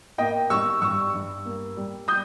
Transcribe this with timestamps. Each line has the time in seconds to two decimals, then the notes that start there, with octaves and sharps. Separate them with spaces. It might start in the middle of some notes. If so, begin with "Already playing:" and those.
0.18 A#3 D#5 G5
0.50 G3 C#6 E6
0.81 G2 C#6 E6
1.14 G2
1.45 A#3
1.77 G3
2.08 D#6 G6